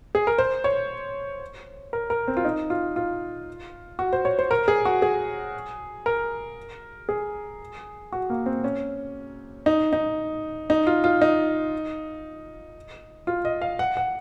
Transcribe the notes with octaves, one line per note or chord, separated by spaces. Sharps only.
G#4
A#4
C5
C#5
A#4
A#4
C4
F4
D#4
F4
F4
F#4
C5
C#5
C5
A#4
G#4
F#4
G#4
A#4
G#4
F#4
A#3
C4
C#4
D#4
D#4
D#4
F4
F4
D#4
F4
D#5
F5
F#5
F#5